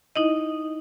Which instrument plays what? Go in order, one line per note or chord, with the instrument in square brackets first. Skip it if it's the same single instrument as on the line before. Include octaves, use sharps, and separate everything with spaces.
[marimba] D#4 E4 D#5